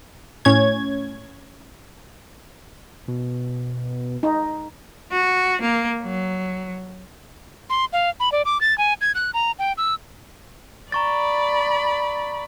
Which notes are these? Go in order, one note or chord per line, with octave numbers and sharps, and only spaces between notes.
A2 C#4 C#5 G#6
B2
D#4
F#4
A#3
F#3
C6
F5
B5
D5
D6
A6
G#5
G#6
F#6
A#5
G5
E6
D5 A#5 B5 C#6 A6